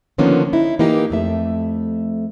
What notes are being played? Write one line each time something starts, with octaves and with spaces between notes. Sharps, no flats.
D3 D#3 F3 A#3 B3 C#4
D#4 E4
E3 A#3 D#4 G4
F2 A3 E5